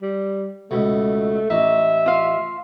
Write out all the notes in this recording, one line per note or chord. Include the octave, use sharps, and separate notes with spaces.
G3
C#2 B2 A3
A1 D#4 E5
F4 F5